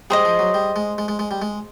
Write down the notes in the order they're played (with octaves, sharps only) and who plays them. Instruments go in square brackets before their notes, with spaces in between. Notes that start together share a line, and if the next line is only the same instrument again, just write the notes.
[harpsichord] G3 [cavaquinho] G#4 C5 D#5
[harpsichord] F3
F#3
G3
G#3
G#3
G#3
G#3
G3
G#3